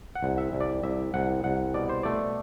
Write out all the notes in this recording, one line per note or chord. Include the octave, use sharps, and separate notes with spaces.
F#5
C2
E5
C2
D5
C2 E5
C2 F#5
C2 F#5
B2 D5
C5
A3 D5